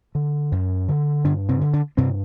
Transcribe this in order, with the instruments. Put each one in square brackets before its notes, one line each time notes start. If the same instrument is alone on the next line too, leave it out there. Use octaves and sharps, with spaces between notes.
[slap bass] D3
F#2
D3
G2 D3 D4
C3 C4
D3
D3 D4
G2 C3 C4